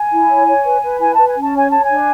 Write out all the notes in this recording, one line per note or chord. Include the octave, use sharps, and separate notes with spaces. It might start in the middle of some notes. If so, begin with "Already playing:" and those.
Already playing: G#5
E4
C#5
C#5
B4
B4
E4 G#5
B4 A5
G#5
C#4
A5
C#5 G#5
C#5 A5
G#5
D4